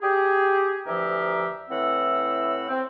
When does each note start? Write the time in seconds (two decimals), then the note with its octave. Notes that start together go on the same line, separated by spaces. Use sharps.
0.02 G4 G#4
0.87 D2 E3 F3 G4 A#4 E5
1.70 A2 E3 C4 F#5 E6
2.69 C4